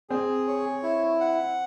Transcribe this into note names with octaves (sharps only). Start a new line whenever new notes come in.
C4 G#4
C#5
E4
F#5